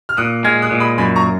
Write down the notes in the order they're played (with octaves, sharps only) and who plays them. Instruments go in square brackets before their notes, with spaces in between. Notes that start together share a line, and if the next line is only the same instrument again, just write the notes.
[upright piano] F6
[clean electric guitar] A#2 [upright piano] D#6 F#6
[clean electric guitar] G#3 [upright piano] F6 G#6
[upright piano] D#6 F#6
[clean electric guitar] A#2
[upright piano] B5 D#6
[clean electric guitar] F#2 [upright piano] G#5 B5
[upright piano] A#5 C#6